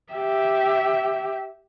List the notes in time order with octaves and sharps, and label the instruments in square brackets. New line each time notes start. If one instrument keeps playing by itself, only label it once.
[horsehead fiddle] G4 E5